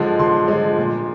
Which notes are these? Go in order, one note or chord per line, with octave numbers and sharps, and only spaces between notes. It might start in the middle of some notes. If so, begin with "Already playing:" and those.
Already playing: D3 F3 G#3
D3 C6
F3 G#3
A#2